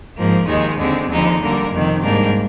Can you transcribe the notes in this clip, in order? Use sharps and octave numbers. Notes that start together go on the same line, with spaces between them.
G#2 F3 A#3
D#2 D#3 G#3 D#4
D#2 D3 G#3 C4
D#2 D3 F3 G#3 D#4
D3 G3 A#3
F2 C3 D#3
G#2 G3 A#3 D4